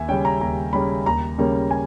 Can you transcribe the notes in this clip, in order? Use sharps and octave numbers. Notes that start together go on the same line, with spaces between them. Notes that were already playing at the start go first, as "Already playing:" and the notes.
Already playing: D#2 E5 G#5
C#3 G3 C#4 G5
A#5
D#2 A#5
C#3 G3 C#4 B5
D#2 A#5
C#3 G3 A#3 C#4
G#5